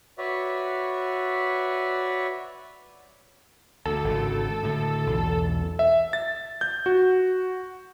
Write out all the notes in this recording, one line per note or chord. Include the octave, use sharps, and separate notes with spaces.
F#4 B4 C#5 D5 E5
D2 A4
G#1 C#3
A2 D3
B1 E2
E5
A6
G6
F#4